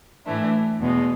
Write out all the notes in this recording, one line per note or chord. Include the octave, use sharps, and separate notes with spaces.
A2 E3 A3 D4
E2 B2 G#3